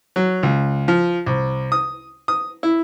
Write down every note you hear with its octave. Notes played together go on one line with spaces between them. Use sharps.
F#3
C#2
F3
C2
D#6
D#6
E4